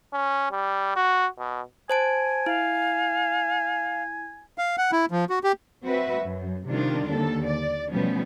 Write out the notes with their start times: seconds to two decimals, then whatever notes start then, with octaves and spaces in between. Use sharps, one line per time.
0.13 C#4
0.51 G3
0.96 F#4
1.38 B2
1.90 C5 G#5 A5 D7
2.46 E4 F5
4.58 F5
4.78 F#5
4.92 E4
5.11 F3
5.30 F#4
5.44 G4
5.84 C4 F#4 B4 E5
6.22 F#2
6.67 C3 D#3 G3 C4 D4 F4
7.09 D#2 D3 A4
7.46 D5
7.92 B2 F3 G3 A3 B3 C#4